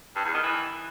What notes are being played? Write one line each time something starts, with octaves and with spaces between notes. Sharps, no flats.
G2
E2
D#3
E3